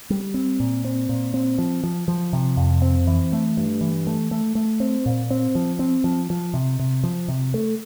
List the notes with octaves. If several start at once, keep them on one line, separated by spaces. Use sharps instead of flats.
G3
C4
A#2
C4
A#2
C4
F3
F3
F3
C3
F2
C4
E3
A3
G2
E3
A3
A3
A3
C4
A#2
C4
F3
C4
F3
F3
C3
C3
F3
C3
A3